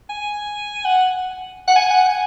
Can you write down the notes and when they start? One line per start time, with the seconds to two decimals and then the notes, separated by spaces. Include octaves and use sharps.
0.09 G#5
0.85 F#5
1.68 F#5
1.76 G#5
1.91 F#5
2.07 G#5